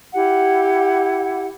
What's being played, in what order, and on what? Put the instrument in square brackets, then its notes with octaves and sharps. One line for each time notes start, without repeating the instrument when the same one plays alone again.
[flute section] E4 G4 F#5